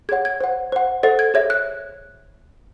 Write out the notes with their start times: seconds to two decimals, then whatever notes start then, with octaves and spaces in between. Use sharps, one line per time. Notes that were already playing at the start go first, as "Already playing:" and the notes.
0.09 G#4 C#5 F#5 G#6
0.25 G#6
0.41 C5 F#5
0.72 C5 F#5
1.03 A4 C5 D#5 F#5 A6
1.19 G#6
1.34 G#4 C#5 E5 G#6
1.50 F#6